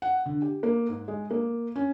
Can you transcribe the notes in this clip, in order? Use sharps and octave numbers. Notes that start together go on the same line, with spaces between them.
F#5
D3
G4
A#3
G#2
G#3
A#3
C#4